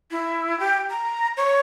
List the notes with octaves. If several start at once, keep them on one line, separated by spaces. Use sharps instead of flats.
E4
G4
A#5
C#5